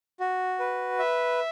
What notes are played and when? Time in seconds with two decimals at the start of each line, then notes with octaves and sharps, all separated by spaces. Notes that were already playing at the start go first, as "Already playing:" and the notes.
0.20 F#4
0.59 B4
0.99 E5